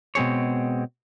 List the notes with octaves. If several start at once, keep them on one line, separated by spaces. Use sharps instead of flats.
B2 G#3 C4 G#4 C#5